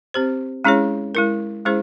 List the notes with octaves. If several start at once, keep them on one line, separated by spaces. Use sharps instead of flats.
C4 G4 C5
G#3 C#4 E4 G#4 C#5
G#3 E4 A#4
G#3 C#4 E4 G#4 C5